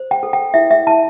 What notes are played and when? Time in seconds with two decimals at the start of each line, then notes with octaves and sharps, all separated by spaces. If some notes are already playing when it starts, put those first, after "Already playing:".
Already playing: C5
0.11 G5
0.23 A4
0.33 G5
0.54 E4 E5
0.71 E5
0.87 E4 A5